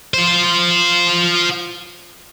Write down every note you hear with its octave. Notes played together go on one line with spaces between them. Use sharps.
F4 C5